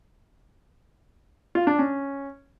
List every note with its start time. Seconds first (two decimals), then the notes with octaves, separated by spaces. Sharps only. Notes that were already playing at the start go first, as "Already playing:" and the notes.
1.55 F4
1.67 D4
1.79 C#4